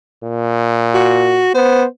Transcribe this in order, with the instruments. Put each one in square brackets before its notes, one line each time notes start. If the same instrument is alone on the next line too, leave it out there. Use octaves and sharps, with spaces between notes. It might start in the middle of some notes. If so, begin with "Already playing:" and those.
[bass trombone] A#2
[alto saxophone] F#4
[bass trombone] B3 [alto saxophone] C5